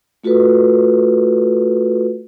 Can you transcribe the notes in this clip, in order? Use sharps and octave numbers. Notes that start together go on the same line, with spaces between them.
A3 F4 F#4 A4 B4